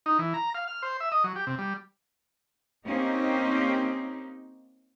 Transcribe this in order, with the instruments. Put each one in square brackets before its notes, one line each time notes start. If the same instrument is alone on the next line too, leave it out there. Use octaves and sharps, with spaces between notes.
[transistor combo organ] D#4
E3
A#5
F5
F6
C5
E5
D#5
F#3
G4
C3
G3
[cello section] A#3 C4 C#4 D#4 G4